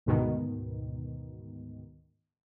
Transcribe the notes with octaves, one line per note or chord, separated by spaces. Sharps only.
D2 G#2 B2 D#3